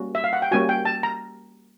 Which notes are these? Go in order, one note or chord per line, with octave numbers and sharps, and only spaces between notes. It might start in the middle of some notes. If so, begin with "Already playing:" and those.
Already playing: G3 A#3 C#4 F#4
E5
F5
F#5
G5
G3 A#3 C#4 F#4 G#5
G5
A5
A#5